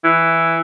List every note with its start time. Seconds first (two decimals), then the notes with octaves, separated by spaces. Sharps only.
0.04 E3